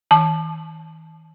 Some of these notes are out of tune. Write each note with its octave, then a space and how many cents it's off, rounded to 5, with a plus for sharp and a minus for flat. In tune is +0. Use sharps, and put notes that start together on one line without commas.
E3 -45 A5 -15 D6 +45